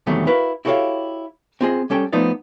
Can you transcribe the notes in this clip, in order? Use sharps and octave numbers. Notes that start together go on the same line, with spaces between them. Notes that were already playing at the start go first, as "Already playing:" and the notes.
E2 C3 D#3 F#3 G3 A3
E4 F#4 A#4 B4 F5
E4 F#4 G4 A4 C#5 F5
C4 F4 G#4 D#5
G3 C#4 A4 G5
F3 A3 B3 D#4 F4 D5